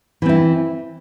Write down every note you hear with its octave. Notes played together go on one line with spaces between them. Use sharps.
E3 C4 E4